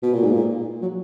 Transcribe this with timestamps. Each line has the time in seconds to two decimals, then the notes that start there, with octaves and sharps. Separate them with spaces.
0.03 B2
0.13 A#2
0.23 G#2
0.32 A#2
0.81 F#3